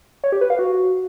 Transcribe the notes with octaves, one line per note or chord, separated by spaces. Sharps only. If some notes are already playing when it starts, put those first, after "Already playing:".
C#5
G4
B4
F5
F#4